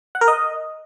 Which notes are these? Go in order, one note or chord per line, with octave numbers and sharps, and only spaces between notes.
F#5
A#4
D#5